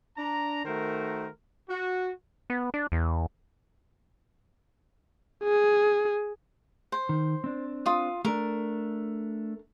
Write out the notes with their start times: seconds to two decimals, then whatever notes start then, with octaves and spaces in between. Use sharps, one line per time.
0.16 D4 A#5
0.64 D#3 A3 F#4 A#4 C5
1.69 F#4
2.50 B3
2.74 D4
2.92 E2
5.43 G#4
6.92 C5
7.09 D#3
7.44 C4 D4
7.86 F4 D#6
8.25 A3 D4 A#4